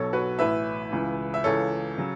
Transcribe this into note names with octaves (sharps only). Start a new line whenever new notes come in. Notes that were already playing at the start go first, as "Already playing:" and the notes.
Already playing: B1 B2 F#3 A4 C#5
F#4 B4
A1 A2 E3 B4 E5
C#2 C#3 E3
E5
C#2 C#3 E3 A4 C#5
C#3 F#3